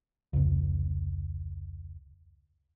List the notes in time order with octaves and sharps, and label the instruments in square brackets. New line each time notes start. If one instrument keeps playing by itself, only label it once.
[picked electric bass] F1 C#2